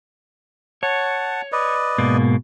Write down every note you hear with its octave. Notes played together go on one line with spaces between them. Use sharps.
C#5 F#5 A5
B4 D5 D#5
G#2 B2 A#3